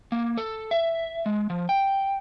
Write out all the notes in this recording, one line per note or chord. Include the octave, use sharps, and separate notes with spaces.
A#3
A4
E5
G#3
F3
G5